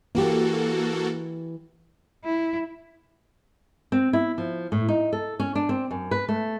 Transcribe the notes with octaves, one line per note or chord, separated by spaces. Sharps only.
E3 A#3 F#4 G4 A4
E4
C4
E4
F3
A2
D#4
A4
C#4
D4
C4
F#2
B4
A3